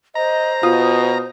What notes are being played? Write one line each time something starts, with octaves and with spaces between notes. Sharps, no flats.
C5 D#5 A#5
B2 F4 D#6